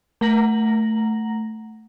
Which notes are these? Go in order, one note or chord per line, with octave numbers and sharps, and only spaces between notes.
A3 F#5 A#5 A#6 F#7